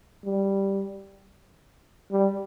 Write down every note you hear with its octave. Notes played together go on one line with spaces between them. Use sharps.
G3
G3